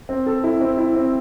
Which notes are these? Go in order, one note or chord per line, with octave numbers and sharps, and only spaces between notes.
C4
A4
E4
C4
E4
C4